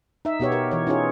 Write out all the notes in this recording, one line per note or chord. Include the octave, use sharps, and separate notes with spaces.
D#4 E5
B2 B3 G4 C#5
G4 A#4
E3 C#5
C#4 D#4 F4 G#4 C#5